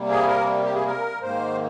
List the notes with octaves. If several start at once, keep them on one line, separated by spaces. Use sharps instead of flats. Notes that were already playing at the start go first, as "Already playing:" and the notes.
Already playing: C3 G3 A#3
G#4
A#4
G4
G#4
A#4
G#2 D#3 A#3 C5